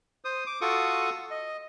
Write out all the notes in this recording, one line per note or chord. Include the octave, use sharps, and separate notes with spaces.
C5 D#6
D6
F4 F#4 A4 C#6 D#6
D#5